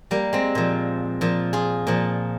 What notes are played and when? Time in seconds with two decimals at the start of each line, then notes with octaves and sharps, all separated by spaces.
0.11 G3 A#3
0.33 G#3 C4
0.55 A#2 F3
1.21 A#2 F3
1.53 F4 G#4
1.87 A#2 F3